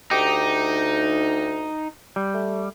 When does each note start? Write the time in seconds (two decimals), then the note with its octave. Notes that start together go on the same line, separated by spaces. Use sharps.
0.11 D2 D#4 G4
2.16 G3
2.34 A3